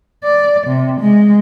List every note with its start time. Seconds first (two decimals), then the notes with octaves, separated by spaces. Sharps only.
0.24 D5
0.67 C3
1.00 G#3